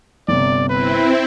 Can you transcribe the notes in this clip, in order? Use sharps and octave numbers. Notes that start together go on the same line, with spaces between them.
G1 C3 D5
C4 E4 B4